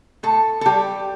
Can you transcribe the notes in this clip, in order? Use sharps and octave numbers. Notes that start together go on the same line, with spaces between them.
A2 A4
A4
G3 G4